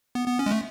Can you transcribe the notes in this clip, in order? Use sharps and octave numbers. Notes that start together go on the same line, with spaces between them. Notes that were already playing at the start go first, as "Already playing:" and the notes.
B3
B3
C#4
G#3
A3